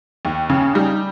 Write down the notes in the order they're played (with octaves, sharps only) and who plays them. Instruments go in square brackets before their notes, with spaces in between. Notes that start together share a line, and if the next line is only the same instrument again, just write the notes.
[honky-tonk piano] D#2
[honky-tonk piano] C#3 [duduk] C#4
[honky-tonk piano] G3 [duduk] D#4